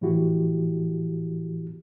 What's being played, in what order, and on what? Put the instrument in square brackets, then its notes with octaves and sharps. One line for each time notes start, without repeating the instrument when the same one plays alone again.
[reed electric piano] A2 E3 F3 E4 F#4 G4